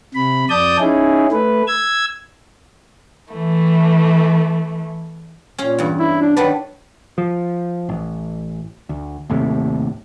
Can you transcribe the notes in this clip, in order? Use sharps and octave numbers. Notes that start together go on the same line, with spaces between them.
C3 B5
F2 D5 A5 D#6 G6
C#4 D#4 E4 G#4
A3 B4
E6 G#6
E3 A3
A#2 C#4 F5
E2 G2
E4
D4
D#3 F#3 D4 B4
F3
A1
D2
D#2 A2 C3